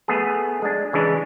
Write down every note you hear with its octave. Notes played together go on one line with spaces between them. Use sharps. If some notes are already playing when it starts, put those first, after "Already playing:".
A3 B3 G#4
G#3 D4
C#3 E3 G#3 D4